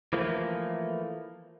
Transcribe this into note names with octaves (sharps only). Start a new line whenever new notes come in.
E3 F3 A3 A#3